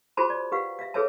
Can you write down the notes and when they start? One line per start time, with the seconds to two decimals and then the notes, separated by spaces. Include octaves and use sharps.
0.17 F4 F#4 G#4 C5 A5 B5
0.30 D5
0.52 G4 B4 F5 F#5
0.79 E5 F5
0.94 G#4 A4 B4 C#5 E5 A5